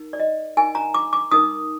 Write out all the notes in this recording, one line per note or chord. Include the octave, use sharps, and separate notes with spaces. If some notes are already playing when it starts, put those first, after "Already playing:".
Already playing: D#4 A#4
D5
D#5
D#4 A#4 G#5
A#5
D6
D6
D#4 A#4 D#6